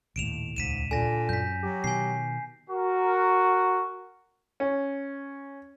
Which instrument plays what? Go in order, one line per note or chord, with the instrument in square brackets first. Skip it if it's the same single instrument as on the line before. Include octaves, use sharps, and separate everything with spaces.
[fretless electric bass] D#1 D#2 A2 [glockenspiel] D7 E7 F7
[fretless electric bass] D#1 C#2 [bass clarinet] G#2 [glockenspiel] B6 D#7 E7
[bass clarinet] A#2 [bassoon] D3 [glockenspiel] G#5 A#6
[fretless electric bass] F#2 [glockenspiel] G6 B6
[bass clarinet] F#3 [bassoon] G4
[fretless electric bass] B2 D#3 [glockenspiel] G#5 C7
[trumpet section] F#4 A#4
[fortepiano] C#4